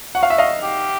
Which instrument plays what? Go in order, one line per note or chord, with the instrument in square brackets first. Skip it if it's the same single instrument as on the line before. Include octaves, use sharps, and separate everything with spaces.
[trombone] F#4 [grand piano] F#5
[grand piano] F5
E5
D#5 F5
[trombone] G4